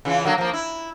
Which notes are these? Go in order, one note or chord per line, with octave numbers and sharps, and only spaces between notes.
C#3 E3 F4
D3 F#3 A#3
F3 A#3
E4